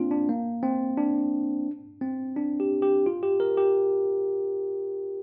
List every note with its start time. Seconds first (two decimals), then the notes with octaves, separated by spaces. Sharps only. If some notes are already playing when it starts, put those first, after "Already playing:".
Already playing: A#3 C4 D4 F4
0.11 D4
0.29 A#3
0.63 C4
0.97 D4
2.01 C4
2.36 D4
2.60 G4
2.82 G4
3.06 F4
3.23 G4
3.40 A#4
3.57 G4